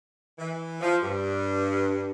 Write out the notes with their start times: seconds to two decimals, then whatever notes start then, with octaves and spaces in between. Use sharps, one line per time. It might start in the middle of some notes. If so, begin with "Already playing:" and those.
0.38 E3
0.81 F3
1.01 G2